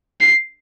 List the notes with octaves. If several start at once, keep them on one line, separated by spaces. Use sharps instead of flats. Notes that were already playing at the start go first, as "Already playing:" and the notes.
C7